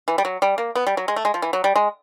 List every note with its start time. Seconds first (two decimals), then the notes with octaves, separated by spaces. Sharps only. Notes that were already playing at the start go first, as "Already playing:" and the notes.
0.08 E3
0.18 G3
0.25 F#3
0.42 G3
0.58 A#3
0.75 B3
0.87 G3
0.97 F#3
1.08 G#3
1.16 A3
1.25 G#3
1.34 F3
1.42 E3
1.53 F#3
1.64 G3
1.76 G#3